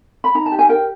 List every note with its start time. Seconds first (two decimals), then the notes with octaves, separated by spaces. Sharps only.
0.24 B5
0.35 D#4 A#5
0.46 A5
0.52 G4
0.59 G#5
0.69 A#4 G5